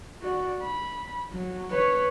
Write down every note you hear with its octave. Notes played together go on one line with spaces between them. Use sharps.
F#4 D5
B5
F#3
B4 C#5